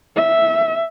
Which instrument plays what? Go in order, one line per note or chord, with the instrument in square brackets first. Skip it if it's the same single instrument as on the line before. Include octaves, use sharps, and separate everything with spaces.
[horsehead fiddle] E5